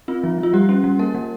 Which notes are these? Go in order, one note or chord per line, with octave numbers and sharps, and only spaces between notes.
C4 F4
F3
F3
F4
G3 G4
C#4
G3
A#3 A#4
G3